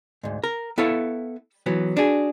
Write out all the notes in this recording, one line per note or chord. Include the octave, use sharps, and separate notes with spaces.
D2 G#2
A#4
B3 E4 A4 C#5 E5 F5
E3 F#3 B3
D4 F#4 G#4